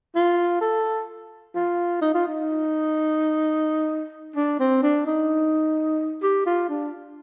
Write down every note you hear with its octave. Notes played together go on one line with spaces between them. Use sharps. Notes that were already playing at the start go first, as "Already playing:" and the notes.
F4
A4
F4
D#4
F4
D#4
D4
C4
D4
D#4
G4
F4
D4